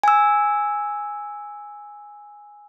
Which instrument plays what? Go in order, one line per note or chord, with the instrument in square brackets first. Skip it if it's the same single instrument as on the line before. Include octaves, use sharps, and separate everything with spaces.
[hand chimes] G#5 E6